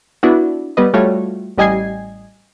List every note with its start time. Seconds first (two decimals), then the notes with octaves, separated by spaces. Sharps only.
0.23 B3 D4 E4 F#4
0.77 G3 B3 B4 D#5
0.94 G3 A3 F4 F#4 C#5
1.58 A1 G3 D#5 G#5 G#6 C7